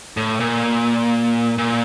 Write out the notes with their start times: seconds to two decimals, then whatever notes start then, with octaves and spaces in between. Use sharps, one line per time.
0.17 A2
0.40 A#2
1.58 A#2